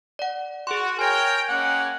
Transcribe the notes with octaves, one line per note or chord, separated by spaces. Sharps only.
D5 F#5
F#4 G#4 C6
A#4 C#5 G5 G#5
G#3 A#3 C#4 F#5